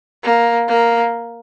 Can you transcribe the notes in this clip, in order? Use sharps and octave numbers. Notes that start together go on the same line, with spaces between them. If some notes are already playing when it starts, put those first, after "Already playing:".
A#3
A#3